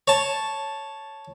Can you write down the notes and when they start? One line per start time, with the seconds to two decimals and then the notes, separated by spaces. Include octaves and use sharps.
0.08 C#5 A5